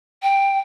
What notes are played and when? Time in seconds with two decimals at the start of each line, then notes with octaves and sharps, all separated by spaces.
0.23 G5